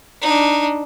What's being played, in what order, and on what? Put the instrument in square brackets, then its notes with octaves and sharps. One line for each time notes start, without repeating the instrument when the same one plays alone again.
[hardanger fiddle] D4 D#4